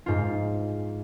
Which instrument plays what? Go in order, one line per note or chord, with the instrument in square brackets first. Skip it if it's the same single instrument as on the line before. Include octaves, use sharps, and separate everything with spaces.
[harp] G#2 F4